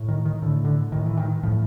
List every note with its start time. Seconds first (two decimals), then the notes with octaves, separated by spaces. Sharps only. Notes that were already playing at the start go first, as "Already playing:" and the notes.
Already playing: A2
0.09 D#3
0.25 D#3
0.42 A2 D3
0.65 D3
0.92 A2 D#3
1.06 E3
1.17 D#3
1.43 A2 F3